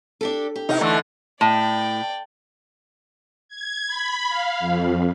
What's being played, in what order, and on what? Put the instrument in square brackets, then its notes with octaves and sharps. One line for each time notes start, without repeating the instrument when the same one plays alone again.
[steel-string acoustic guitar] D4 G4 A4
G4
[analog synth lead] C3 [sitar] D#4 E4
[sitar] D3 E3 [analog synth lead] A3
[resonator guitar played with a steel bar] A2 [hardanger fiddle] D5 G5
[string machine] G#6
B5
F5
F2